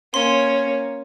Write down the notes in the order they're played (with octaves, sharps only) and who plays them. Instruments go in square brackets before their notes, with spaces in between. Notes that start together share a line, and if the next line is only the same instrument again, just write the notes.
[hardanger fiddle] A#3 C#4 [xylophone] C6